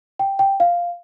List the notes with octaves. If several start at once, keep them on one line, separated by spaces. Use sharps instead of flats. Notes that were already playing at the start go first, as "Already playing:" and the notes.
G5
G5
F5